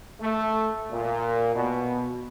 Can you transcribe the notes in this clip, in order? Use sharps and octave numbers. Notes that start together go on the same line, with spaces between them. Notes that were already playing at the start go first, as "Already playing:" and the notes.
A3
A#2
B2